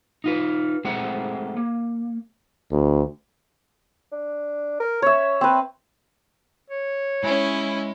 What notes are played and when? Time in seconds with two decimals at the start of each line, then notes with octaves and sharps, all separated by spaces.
0.24 D#4 F4 B4
0.85 G#3 A3 C4 G#4 C5 F#5
1.57 A#3
2.72 D2
4.12 D4
4.80 A#4
5.02 C#4 C#5 E5
5.41 C4 B4
6.70 C#5
7.24 G#3 C#4 E4 G#5